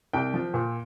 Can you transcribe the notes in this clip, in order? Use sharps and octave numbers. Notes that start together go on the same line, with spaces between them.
C2 G5
F3
A#2